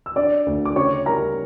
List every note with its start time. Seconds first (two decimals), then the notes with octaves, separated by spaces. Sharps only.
0.06 E6
0.16 D4 D5 D6
0.46 D2
0.65 D6
0.76 C#3 C#5 C#6
1.06 G3 A#4 A#5